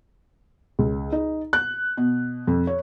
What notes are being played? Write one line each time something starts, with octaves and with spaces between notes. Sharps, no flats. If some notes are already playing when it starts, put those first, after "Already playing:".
C#2
D#4
F#6
B2
F2
C#5